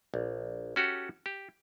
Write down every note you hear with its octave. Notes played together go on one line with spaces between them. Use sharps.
A#1
C#4 F#4 G4 A4
G4